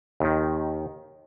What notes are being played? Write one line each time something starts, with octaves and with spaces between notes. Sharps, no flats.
D#2 D#3